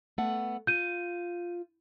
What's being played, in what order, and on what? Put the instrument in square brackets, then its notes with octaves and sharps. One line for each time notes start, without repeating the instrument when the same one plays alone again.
[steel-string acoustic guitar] A3 B3 F#5
[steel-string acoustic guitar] F4 [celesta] G6 D#7